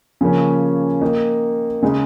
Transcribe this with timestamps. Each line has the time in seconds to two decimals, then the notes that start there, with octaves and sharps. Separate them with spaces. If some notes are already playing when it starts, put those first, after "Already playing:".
0.21 C#3 F3 A#3 C#4
1.01 D#3 A#3 D#4
1.82 C#3 G#3 D#4